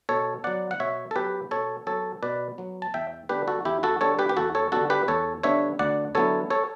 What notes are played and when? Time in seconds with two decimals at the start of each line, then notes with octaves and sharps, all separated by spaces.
0.09 B2 A4 C#5
0.44 F#3 B3 D5 F#5
0.71 F#5
0.80 B2 C#5 E5
1.11 A4
1.16 F#3 B3 G4 B4
1.51 B2 A4 C#5
1.87 F#3 B3 A4 C#5
2.23 B2 B4 D5
2.58 F#3 B3
2.82 A5
2.94 E2 E5 G5
3.29 D3 G3 B3 D4 G4 B4
3.48 F#4 A4
3.65 E2 E4 G4
3.83 F#4 A4
4.01 D3 G3 B3 D4 A4 C#5
4.19 G4 B4
4.29 G4
4.37 E2 F#4 A4
4.55 A4 C#5
4.72 D3 G3 B3 D4 F#4 A4
4.90 G4 B4
5.08 E2 A4 C#5
5.43 D3 G3 B3 D4 C#5 E5
5.79 D2 D5 F#5
6.15 D3 F#3 B3 E4 A4 C#5
6.50 A4 C#5